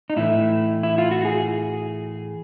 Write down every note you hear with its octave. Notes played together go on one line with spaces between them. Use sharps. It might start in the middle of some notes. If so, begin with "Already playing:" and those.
D#4
A2 E3 A3 E4
E4
F4
F#4
G#4